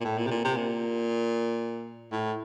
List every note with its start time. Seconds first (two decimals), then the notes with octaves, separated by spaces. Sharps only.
0.01 A#2
0.05 A2
0.18 A#2
0.26 C3
0.31 A#2
0.44 C3
0.57 A#2
2.12 A2